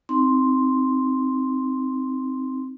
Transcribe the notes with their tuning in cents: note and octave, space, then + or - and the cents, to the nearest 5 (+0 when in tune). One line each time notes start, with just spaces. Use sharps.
C4 +0 D#4 +0 C6 +0